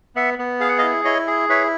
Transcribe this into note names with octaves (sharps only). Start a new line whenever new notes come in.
B3 E5 F#5
B3
G#4 F5
F#5
D#5 F5
E4
E4 C#5 D#5
G#4
E4 B4 C#5